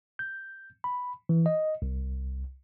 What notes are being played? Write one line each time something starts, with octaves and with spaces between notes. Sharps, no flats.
G6
B5
E3
D#5
C2